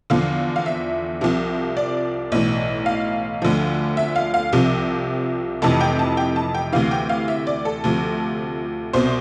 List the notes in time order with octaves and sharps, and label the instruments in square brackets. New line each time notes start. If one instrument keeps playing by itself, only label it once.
[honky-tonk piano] E2 D3 F3 F5
F5
E5
C2 C3 F3
D5
B1 A2 E3
F5
D2 D3 F3
E5
F5
F5
C2 C3 F3
F1 F2 C3 E3 A5
G5
A5
G5
A5
G5
D2 C3 E3 F5
G5
F5
E5
D5
A4
D2 C3 F3
C2 B2 C5